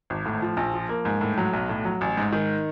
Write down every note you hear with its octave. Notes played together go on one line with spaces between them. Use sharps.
G#1
A2
F3
A#1
F3
A#3
G#2
A2
F#3
B1
A2
F#3
A1
G#2
D#3